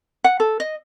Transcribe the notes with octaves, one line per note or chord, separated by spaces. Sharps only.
F#5
A4
D#5